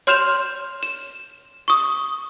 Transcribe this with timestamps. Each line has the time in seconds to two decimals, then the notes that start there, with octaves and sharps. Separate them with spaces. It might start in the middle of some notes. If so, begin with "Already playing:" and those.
0.07 C#5 C6 F6 G6 E7 F7
0.83 E7
1.68 C#6 D#6